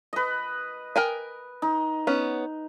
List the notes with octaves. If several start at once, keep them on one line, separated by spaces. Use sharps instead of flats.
B4 D#5
A#4 G5 G#5
D#4
B3 C#4